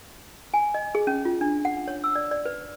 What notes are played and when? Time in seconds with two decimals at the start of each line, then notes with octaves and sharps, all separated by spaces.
0.54 G#5
0.74 D#5
0.95 G#4
1.07 C#4
1.25 F4
1.41 D4
1.65 F#5
1.88 C#5
2.04 E6
2.16 D5
2.31 D5
2.45 B4